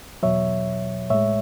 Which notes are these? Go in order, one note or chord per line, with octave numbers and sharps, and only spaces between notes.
E2 B2 F#3 C#5 E5
A2 G#3 C#5 E5